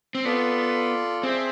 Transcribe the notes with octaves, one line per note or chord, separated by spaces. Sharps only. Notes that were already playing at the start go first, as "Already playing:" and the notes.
C4
B3 F4 A4 D5
C4 G#4 C5 E5